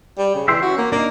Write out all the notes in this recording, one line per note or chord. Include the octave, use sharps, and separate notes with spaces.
G3
C#3
E3 E5 G5 C6
C#4 F#4
A#3
A#3 D4 D#4